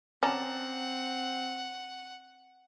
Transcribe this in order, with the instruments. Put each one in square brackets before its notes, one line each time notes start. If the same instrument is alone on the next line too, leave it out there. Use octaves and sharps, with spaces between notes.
[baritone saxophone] C4 [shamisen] C#4 [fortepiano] D5 A5 A#5 [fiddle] F#5